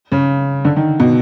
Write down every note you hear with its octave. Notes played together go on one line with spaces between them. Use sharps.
C#3
D3
D#3
B2